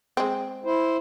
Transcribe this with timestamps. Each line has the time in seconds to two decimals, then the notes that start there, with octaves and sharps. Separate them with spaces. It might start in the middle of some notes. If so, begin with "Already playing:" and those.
0.17 G#3 C4
0.65 E4 C5